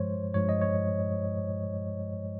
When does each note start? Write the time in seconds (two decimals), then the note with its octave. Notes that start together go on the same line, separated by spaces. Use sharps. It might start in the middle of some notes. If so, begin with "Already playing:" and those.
Already playing: G2 F3 G#3 C5 C#5
0.34 G2 F3 G#3 C#5
0.49 D#5
0.61 C#5